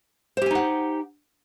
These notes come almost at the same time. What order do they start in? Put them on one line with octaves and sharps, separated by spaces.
C5 G4 G#5 D#4 F#5